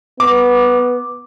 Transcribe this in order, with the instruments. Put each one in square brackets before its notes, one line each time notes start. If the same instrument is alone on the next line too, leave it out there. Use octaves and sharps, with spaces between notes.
[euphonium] B3 [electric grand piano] D6